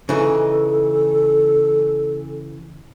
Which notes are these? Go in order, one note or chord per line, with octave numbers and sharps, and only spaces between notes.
C#3 E3 D#4 A4